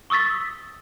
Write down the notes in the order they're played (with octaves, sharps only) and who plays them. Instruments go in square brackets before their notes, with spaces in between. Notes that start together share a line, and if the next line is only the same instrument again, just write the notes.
[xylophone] C#6 D#6 E6 A6 B6